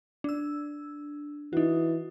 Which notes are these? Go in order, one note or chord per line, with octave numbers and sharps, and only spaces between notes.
D4 E6
E3 D#4 F#4